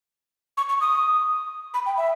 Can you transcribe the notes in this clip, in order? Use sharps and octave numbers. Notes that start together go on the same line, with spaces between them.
C#6
C#6
D#6
B5
G5
E5